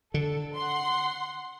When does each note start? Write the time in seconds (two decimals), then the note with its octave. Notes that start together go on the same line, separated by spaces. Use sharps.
0.14 D3 A4
0.55 F#5 C6